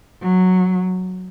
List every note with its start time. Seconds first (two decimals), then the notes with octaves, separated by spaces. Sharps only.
0.21 F#3